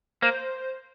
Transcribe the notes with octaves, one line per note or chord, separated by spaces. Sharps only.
A#3 C5